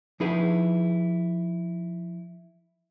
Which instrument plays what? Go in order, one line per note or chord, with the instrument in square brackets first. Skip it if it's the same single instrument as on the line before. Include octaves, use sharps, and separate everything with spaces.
[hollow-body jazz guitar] F3 D#4 E4 G#4 B4